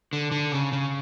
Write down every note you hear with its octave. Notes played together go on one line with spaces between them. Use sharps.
D3
D3
C#3
C#3